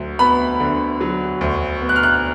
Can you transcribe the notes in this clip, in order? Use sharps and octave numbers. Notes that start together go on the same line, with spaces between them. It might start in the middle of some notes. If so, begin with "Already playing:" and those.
Already playing: D2 F#3
B3 B5
D3
F#3
D2
B3
F#6
F6
F#6